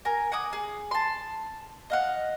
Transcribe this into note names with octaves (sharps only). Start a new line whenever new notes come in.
A#4 G#5
F#5 G#5 D6 D#6
G#4
A5 C6
D#5 F5 F#5